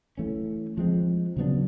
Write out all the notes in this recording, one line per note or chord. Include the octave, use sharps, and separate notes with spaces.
E3 A3 C#4
F3 G#3 C4
C#3 F#3 B3 D4